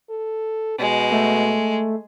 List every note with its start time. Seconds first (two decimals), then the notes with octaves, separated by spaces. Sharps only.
0.10 A4
0.79 B2 G#3
1.12 A3